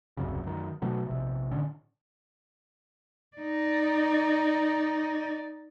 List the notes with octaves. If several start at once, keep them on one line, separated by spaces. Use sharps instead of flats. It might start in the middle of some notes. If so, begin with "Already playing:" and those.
D#1 C2 F#2 C#3
F#2 D#3
B2 F#3 A3
A#1 C3
A2 D3 C#4
D#4 D5